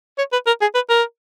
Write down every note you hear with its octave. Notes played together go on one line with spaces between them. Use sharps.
C#5
B4
A#4
G#4
B4
A#4